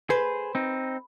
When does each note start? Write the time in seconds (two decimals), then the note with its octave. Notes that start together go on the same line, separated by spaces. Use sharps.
0.10 G#4 B4 C5
0.55 C4 D#4